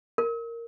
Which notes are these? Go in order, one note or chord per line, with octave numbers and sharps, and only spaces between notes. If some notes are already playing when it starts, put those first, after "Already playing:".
A#4